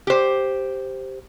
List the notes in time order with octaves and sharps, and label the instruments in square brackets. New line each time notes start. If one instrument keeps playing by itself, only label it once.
[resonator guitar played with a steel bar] G4 C5